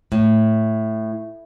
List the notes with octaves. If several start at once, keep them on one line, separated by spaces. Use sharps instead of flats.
A2